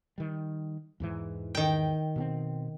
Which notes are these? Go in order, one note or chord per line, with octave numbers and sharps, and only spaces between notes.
D#3 G3
E2 G#2 E3
D#3 G5
B2 B3 C4